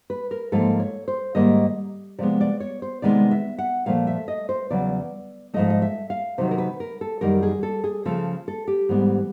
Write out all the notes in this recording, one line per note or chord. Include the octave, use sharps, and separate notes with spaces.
B4
A#4
G#2 F3 A#3 A4
C#5
C5
G#2 D#3 G3 A#3 D#5
C3 F3 G#3 B3 D5
D5
C#5
C5
C3 D#3 G#3 B3 D5
E5
F#5
A#2 F3 A3 F5
E5
D#5
C5
E2 C#3 F#3 D5
G#2 F3 A3 D#5
D#5
E5
F5
C3 D#3 F#3 A3 C5
A#4
B4
A#4
A4
F#2 D#3 G3 A#4
G#4
A4
G#4
C#3 F3 A3 A4
A4
G4
G#2 E3 G3 B3